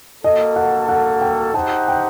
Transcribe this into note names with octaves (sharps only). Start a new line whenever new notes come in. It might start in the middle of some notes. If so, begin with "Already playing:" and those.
A#3 F#4 A4 D#5
F#5
F#5
G5
D#4 G4 C5 F#5 A5
G5